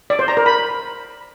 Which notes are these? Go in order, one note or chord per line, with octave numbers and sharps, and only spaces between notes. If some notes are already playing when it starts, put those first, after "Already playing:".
D5
C5
A#5
A#4
B5